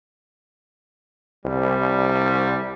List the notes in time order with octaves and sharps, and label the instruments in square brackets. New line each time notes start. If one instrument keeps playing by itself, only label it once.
[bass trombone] C2 [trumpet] G3